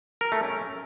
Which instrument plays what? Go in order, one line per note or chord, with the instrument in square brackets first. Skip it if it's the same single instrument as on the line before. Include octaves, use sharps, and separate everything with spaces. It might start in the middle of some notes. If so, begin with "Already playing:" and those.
[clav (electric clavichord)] A#4
A3
C#4